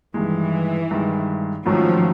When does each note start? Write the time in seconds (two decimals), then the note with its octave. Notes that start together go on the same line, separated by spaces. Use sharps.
0.14 G2 D#3 E3 G#3
0.91 G2 D#3 G#3
1.66 G#2 D#3 F3 F#3 A3 C#4